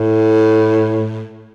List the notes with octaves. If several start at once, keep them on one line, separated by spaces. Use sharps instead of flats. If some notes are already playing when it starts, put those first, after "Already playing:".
Already playing: A2